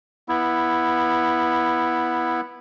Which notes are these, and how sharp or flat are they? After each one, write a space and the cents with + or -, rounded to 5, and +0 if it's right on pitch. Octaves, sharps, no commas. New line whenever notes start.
B3 -10 E4 +0